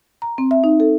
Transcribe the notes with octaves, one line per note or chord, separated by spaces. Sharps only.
A#5
C4
E5
D#4
A4